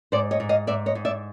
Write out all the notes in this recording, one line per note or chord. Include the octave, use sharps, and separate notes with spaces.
G#2 C5 D5
C#5 D#5
G#2
D#5 F5
G#2 D5 E5
C#5 D#5
G#2
D5 E5